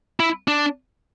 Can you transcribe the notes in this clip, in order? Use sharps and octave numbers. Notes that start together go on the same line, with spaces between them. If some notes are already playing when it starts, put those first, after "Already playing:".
E4
D4